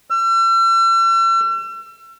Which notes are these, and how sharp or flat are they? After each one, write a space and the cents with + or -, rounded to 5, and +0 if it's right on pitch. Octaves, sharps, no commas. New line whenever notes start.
E6 +40